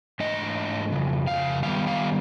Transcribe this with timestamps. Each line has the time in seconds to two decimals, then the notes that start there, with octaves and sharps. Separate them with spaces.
0.20 G#2 E3 A3 D4 D#5
0.92 F2 C#3
1.27 F5
1.63 D#3 G3 B3 F5
1.87 F5